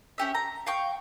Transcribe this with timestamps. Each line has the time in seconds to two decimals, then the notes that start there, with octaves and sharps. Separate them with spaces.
0.18 C#4 G4 E5
0.35 A#5
0.67 F5 G5 C#6